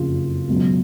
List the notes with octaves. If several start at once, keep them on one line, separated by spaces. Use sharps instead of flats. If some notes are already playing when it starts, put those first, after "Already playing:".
Already playing: F#1 F2 C#3 F4
C#2 B2 F#3